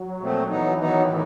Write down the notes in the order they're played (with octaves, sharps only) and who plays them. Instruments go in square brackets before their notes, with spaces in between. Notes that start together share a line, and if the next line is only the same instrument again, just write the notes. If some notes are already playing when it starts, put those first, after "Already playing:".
Already playing: [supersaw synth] F#3
[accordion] A#2 F3 A3 C4
[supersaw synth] E3 [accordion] F#3 B3 D#4
[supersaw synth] D#3 [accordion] F#3 B3 D#4
[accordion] A2 E3